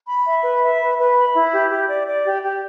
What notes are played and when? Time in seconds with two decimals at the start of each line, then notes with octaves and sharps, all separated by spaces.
0.08 B5
0.25 E5
0.43 B4
0.62 E5
0.80 B4
0.98 B4
1.17 B5
1.34 E4
1.52 G4
1.70 G4
1.88 D5
2.08 D5
2.25 G4
2.43 G4